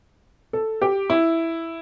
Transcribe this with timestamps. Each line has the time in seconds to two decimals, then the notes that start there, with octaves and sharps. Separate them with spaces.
0.53 A4
0.82 G4
1.10 E4